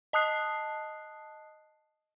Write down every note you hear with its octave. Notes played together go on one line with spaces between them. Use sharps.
D#5 A5 D#6 F#6 C7